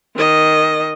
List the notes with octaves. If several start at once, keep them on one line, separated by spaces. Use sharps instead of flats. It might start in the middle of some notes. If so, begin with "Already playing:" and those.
D#3 D#5